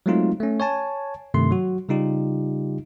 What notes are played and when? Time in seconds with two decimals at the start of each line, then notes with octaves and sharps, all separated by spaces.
0.06 F#3 G#3 A3 C4 D#4 F4
0.40 A3 C#4
0.60 C#5 G#5 A5
1.34 G2 C3 D#3 A3 C6
1.51 F#3 F#4
1.89 C#3 G3 D#4 F4 G4